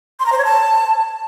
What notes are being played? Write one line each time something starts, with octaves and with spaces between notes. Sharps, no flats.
C6
A#5
C5
C#5
A5